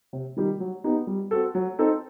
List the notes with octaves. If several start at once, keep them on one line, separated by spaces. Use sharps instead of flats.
C3
D#3 G3 D#4 G4
F#3
B3 D#4 G4
G3
C4 F#4 A4
F#3
C4 D#4 A4